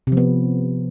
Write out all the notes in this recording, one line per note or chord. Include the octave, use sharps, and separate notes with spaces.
C3 F3 B3